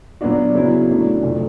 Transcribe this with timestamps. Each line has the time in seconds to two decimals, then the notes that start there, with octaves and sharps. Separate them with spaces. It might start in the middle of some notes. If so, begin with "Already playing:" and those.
0.21 A#2 F#3 B3 D4 F#4
0.55 C#3 F#3 B3 E4
0.89 A2 F#3 A3 D4
1.23 F2 C3 F3 A3